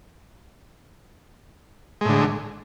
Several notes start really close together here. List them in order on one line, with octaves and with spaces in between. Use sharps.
G#3 A2 D3